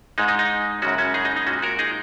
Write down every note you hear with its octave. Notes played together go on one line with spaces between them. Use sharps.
G#2 G#3 D#4
D#4
D#4
F#2 C#3 G#3 C#4 F#4
C#4 F#4
D#4 G#4
D#4
D#4
A#2 G#3 C#4 F#4
F#4 A#4
D#4 G#4